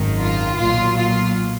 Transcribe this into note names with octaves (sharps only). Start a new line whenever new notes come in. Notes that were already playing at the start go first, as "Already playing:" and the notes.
Already playing: G#1 F#2 D#3
F4
B1 A#2 F#3 F4
F4